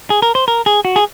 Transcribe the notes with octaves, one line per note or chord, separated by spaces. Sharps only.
G#4
A#4
C5
A#4
G#4
F#4
G#4